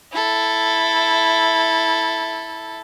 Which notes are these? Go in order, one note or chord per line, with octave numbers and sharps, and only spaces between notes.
E4 A4